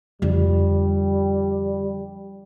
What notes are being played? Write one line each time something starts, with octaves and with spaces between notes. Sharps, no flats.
F2 D3 G3